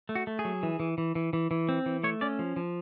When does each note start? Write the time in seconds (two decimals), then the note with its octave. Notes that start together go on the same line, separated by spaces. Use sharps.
0.09 A3
0.15 F#4
0.27 A3
0.39 G#4
0.45 F#3
0.63 E3
0.80 E3
0.98 E3
1.15 E3
1.33 E3
1.51 E3
1.69 C4
1.86 E3
2.04 A3 C#5
2.21 C#4 D5
2.39 F3
2.56 F3